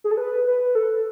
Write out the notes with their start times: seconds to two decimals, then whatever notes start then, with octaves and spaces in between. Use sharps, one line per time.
0.04 G#4
0.11 A4
0.17 B4
0.47 B4
0.75 A4